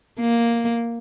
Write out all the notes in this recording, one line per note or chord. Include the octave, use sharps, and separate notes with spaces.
A#3